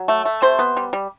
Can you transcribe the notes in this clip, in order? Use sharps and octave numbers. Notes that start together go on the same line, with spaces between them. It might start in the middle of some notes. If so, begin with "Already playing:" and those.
Already playing: F#3
A3
A3
C3 C5
B3
G3
G3